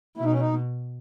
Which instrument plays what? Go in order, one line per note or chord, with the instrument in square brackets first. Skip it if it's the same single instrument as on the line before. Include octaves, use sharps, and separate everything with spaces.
[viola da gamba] B2 [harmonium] E4
[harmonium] D#4
C#4
D#4